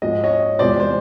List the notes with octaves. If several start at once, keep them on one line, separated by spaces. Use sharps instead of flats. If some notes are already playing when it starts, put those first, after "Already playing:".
G#2 F3 G#3 D#5
C#5 D#5
E2 C3 F3 G#3 C5 D5
C5